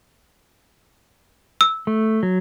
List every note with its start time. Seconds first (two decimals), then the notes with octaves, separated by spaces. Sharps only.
1.61 E6
1.87 A3
2.23 F#3